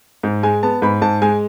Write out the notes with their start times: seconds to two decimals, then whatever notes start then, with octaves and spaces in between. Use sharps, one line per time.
0.23 G#2
0.43 G#3 G#5
0.63 B3 A5
0.82 G#2 B5
1.02 G#2 A5
1.22 G#3 G#5